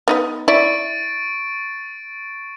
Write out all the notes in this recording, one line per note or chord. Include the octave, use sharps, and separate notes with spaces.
B3 D#4 B4
E4 D5 C#6 A6 D7